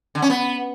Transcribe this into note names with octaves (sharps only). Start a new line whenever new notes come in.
D3
C#4
B3